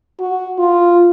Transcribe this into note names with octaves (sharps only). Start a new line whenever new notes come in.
F#4
F4